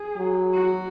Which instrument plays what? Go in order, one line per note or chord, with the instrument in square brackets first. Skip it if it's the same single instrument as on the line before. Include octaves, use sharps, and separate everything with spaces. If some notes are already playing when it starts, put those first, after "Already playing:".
Already playing: [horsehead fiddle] G#4
[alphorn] F#3
[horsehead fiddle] F#4